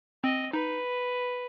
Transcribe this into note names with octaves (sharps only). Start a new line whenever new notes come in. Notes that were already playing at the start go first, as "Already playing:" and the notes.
C4 D#5
D#4 B4